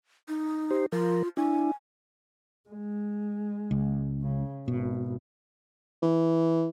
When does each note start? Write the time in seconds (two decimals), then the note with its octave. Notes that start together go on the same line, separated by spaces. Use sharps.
0.28 D#4
0.71 G4 C5
0.92 F3 F4 A#4
1.37 D4 E4 G#5
2.70 G#3
3.71 C#2
4.22 C#3
4.68 G#1 B2
6.02 E3